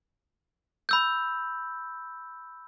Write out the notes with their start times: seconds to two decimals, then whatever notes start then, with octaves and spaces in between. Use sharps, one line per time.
0.89 B5 E6 G6